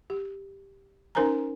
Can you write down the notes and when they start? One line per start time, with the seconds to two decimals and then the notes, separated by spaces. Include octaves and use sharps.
0.10 G4
1.15 C#4 D#4 A#4 C5 G#5 A#5